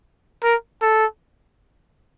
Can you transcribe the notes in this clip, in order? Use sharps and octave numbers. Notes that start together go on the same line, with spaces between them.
A#4
A4